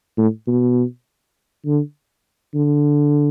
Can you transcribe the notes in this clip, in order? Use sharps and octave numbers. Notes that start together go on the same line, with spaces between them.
A2
B2
D3
D3